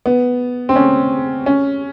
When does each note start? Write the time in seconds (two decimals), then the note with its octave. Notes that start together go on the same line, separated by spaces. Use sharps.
0.06 B3
0.69 C4
0.76 C#4
1.46 C#4